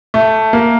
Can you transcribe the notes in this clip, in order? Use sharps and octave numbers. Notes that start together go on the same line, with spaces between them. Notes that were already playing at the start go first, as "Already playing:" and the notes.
A3
A#3